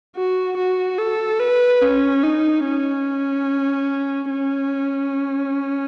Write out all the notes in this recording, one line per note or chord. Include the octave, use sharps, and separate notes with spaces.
F#4
F#4
A4
B4
C#4
D#4
C#4
C#4